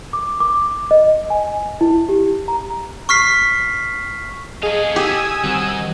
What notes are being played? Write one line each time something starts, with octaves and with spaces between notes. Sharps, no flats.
D6
D6
D#5
G#5
E4
G4
A#5
C#6 F6 B6 C7
G#4 A4 D#5 F5
G4 G#5 D#6 E6
D#3 G3 C4 F#4